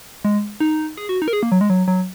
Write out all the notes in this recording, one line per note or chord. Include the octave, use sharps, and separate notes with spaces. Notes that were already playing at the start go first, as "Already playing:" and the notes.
G#3
D#4
G#4
F#4
D#4
A#4
G#4
A#3
F#3
G#3
F#3
F#3